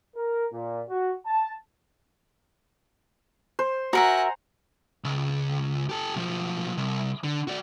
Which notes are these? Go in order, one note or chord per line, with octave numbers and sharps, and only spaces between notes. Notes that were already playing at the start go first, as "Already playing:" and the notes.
A#4
A#2
F#4
A5
C5
F#4 A#4 E5 F#5 G#5 A#5
C#2
G4 A4
B1 F3
C2
D3
F#4 D5